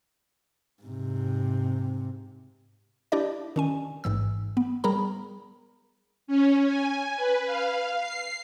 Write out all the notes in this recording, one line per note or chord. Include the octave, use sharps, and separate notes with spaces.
G#2 C3
D4 E4 G4 D5 D#5
D#3 C#4 G#5
A1 G#2 E3 E6
B3
G3 G#4 A#4 A#5 B5
C#4
G#5
B4
F5
C7